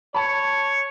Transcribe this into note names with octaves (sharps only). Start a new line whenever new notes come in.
C#5 A5 B5